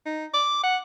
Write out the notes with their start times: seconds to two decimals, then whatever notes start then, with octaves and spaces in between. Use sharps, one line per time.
0.06 D#4
0.33 D6
0.63 F#5